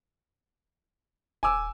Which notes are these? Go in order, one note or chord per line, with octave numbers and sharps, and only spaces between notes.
D#1 G#5 D6 E6